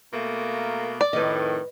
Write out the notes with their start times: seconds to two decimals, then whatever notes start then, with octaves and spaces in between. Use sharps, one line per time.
0.13 B2 A3 A#3
1.01 D5
1.13 F2 A2 D#3 B4 D#5